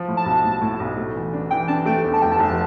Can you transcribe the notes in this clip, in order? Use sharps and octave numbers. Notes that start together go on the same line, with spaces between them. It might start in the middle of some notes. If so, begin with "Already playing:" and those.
Already playing: F3
A2
A5
B1
A2
A2
B1
A3
E3
D4
E3 G5
D4 A5
A3 G5
E2
A5
F1 G5
A5
F1